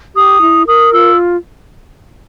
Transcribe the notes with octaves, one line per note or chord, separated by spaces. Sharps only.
G4 D#6
E4
A#4 D#6
F4 E6